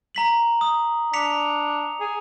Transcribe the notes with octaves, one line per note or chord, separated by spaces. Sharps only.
A#5 B6 F#7
D#6
D4 B6 C#7 F7
G#4